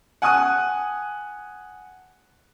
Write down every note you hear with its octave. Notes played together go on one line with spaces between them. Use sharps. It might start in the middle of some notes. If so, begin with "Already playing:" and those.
F#5 G#5 A5 D#6 F#6 D#7